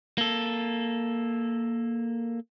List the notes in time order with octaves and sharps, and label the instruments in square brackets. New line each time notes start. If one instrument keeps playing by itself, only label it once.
[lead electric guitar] A#3 A4